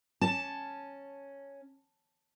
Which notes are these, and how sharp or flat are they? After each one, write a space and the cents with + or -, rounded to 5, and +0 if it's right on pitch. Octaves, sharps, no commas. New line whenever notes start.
C#4 +0 A5 +0